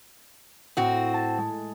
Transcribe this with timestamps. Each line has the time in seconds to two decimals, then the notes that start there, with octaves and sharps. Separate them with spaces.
0.77 A2 C4 F#4
1.14 A5
1.38 G#3